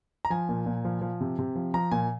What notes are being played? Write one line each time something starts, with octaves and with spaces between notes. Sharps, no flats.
A#5
F3 G#5
A#2
A#2
F3
F3
C3
C3
F3
F3 A#5
A#2 G#5